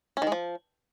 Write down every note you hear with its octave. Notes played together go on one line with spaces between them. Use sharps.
C#4
D#3
G#3
F3